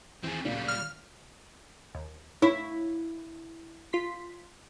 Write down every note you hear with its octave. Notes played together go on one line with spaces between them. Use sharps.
D#2 E3 C4 G#4
D1 A#2 C#3 F#3 G3
F6
D#2
E4 C#5
F4 C6 B6